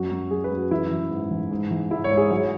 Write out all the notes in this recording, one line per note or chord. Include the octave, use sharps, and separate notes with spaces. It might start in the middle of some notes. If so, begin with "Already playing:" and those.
Already playing: F#2 F#4
F#2
F#3 G#4
B4
F#2
F#4
E3 E4
E3
G#2
E3
G#2
E3
G#2 E4
C#5
G#2
G#4
F#3 C#5